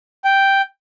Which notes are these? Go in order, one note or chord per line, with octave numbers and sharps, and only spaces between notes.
G5